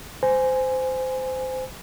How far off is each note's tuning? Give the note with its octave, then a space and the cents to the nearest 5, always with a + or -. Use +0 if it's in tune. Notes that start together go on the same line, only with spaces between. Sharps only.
C5 -20 G#5 +0